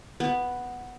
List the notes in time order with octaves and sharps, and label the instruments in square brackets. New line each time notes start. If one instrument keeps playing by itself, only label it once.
[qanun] B3